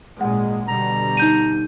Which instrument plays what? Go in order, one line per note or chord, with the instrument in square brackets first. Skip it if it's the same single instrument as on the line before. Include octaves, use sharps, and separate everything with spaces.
[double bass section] G#1 A#2 G#3 [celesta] F#5
[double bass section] B2 D3 G3 [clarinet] A#5
[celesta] D#4 G6 D#7